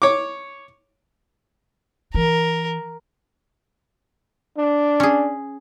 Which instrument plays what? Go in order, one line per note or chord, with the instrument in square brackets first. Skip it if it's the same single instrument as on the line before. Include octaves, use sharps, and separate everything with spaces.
[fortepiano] C#5 D6
[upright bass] E3 [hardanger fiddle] A#4
[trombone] D4
[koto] C#4 G#4